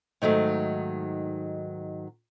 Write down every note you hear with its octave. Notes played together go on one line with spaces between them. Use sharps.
G#2 D#3 F#3 A3